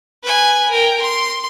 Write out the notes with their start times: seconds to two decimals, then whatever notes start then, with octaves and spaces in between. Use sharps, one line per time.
0.23 B4 G#5
0.70 A#4 G5
1.02 C6